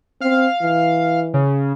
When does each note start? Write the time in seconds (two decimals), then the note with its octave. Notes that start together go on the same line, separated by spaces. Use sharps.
0.21 C4 F5
0.62 E3
1.34 C#3